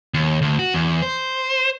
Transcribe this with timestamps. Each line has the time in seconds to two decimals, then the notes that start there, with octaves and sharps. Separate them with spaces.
0.14 D#2
0.42 D2
0.59 F#4
0.74 E2
1.02 C5